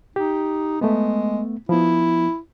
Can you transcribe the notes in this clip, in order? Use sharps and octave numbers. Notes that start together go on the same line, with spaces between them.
D#4 G4
G#3 A3 B3
F3 B3 E4